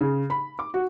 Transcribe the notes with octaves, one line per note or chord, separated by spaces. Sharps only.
C#3
B5
D6
F#4